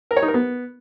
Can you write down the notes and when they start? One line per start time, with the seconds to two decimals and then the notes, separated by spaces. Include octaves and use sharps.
0.11 A#4
0.17 C#5
0.22 D#4
0.28 A#4
0.34 B3